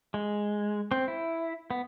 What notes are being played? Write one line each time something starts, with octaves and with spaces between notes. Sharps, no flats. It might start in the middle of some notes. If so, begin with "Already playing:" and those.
G#3
C4
E4
B3